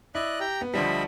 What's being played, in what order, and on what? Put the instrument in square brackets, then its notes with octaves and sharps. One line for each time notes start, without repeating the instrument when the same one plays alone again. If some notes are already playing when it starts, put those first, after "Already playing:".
[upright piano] E4 [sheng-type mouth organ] D5 D#5 F#6
[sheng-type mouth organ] G4 G5 A#5
[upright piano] B3
[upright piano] D2 F3 G3 [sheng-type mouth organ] D#5 E5 B5